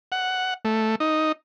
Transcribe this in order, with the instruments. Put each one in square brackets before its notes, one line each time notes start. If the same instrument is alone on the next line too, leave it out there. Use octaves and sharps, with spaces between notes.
[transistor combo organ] F#5
A3
D#4